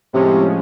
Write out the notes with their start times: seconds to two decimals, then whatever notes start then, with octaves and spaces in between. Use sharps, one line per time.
0.13 A2 C3 F3 G#3 C#4